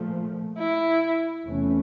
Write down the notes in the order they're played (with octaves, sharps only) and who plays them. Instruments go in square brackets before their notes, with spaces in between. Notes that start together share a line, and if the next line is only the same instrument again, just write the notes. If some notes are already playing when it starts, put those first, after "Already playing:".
Already playing: [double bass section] A#2 F3 A3
[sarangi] E4
[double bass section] E2 C3 E3 A3 C#4